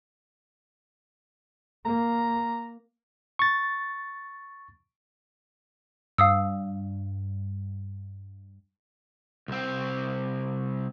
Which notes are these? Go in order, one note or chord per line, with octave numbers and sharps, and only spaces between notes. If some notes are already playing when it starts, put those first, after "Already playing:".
A#3 A#5
C#6 A6
G2 F5 D#6 E6
C2 C4